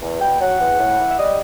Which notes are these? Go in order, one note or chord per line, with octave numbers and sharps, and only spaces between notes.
E2
B2 G5
F#3 F#5
E2
A2
E3
E5
G3 D#5